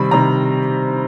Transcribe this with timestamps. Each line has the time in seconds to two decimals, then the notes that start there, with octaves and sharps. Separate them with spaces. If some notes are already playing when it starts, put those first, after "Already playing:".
Already playing: C3 D#3 G3 B5
0.11 C3 D#3 G3 A#5